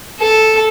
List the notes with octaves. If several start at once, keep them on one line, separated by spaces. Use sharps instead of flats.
A4